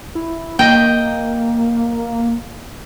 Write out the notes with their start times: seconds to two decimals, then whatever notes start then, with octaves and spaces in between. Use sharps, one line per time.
0.15 E4
0.59 A#3 D#5 G5